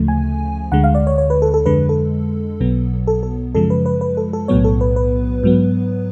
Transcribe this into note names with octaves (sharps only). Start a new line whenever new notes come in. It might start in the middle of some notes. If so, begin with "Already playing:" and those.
Already playing: D2 C#3 F3 A3
G#5
D2 D3 G#3 F#5
F5
D5
C#5
C#5
B4
A4
A4
F2 D3 G#3 B4
A4
B1 B2 F#3 B3
A4
A4
F#2 C#3 F3 G#3 A4
B4
B4
B4
A4
A4
B1 A2 F#3 B3 C#5
A4
B4
B4
G#2 F#3 B3